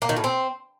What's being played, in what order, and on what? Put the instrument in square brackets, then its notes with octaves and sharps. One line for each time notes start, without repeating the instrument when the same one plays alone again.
[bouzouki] A#3
D#3
A2
C4